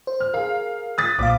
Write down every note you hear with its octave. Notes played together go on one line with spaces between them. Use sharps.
C5
F6
G#4 A#4 F5
D#6 F#6 A6 B6
B1 A#2 F5 D6